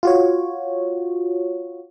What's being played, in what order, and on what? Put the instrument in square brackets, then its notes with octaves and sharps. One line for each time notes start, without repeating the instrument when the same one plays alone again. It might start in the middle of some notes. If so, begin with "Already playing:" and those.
[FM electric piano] F4 F#4 C#5